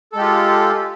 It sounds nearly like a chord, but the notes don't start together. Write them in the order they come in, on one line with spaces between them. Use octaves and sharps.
A4 G#3 G4 F4